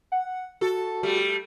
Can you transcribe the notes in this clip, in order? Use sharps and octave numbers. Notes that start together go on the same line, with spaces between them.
F#5
F#4 A4
G3 A3